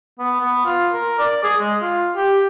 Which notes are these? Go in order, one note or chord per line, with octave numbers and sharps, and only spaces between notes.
B3
B3
F4
A#4
D5
G#4
G#3
F4
G4